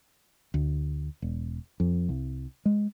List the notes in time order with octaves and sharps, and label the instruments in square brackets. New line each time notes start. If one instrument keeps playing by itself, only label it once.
[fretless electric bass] D2
E1
F2
C2
G#3